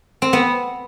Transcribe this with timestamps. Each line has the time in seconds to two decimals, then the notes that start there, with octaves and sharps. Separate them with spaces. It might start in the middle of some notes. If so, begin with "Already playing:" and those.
0.22 C4
0.33 B3